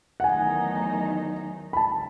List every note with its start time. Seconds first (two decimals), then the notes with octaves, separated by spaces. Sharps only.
0.20 F#5
0.24 E2 D#3 F#3 A3 D#4 G#5
1.73 B5
1.77 F#2 C#3 G#3 A5